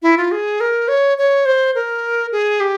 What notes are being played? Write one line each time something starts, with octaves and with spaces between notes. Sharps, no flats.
E4
F4
G#4
A#4
C#5
C#5
C5
A#4
G#4
G4